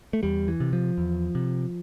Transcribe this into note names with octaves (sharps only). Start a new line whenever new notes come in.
A3
E2 G3
E3
C3
F3
E2
C3